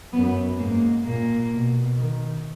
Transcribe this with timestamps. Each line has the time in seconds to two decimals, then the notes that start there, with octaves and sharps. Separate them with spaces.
0.13 F#2 B3
0.58 G#2 A#3
1.05 A#2 A#3
1.50 B2
1.97 D#3